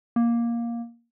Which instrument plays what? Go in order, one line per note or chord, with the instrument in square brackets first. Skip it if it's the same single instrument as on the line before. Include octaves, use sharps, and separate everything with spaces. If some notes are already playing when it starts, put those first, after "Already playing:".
[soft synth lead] A#3